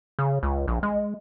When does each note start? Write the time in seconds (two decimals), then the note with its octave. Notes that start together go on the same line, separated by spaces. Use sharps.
0.19 C#3
0.43 C#2
0.68 A#1
0.83 G#3